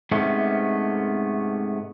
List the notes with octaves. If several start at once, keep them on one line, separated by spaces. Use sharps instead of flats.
G#2 C3 A3 B3 C#4 D4